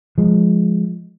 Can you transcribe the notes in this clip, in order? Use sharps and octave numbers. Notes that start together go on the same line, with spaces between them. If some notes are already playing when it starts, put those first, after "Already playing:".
F3 G#3